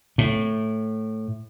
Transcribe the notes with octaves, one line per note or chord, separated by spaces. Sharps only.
A2